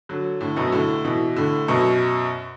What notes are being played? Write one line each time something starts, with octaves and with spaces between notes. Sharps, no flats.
D3 F#3
A2 D3
F#2 B2
A2 D3
B2 E3
A2 D3
F#2 B2